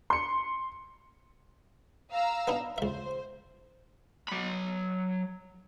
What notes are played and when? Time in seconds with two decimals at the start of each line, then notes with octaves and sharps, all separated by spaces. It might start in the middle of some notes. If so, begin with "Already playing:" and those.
0.10 C6 C#7
2.11 F5 A#5 E6
2.47 B3 D4 D#4
2.78 C#2 C5 E5
4.28 F#3 B5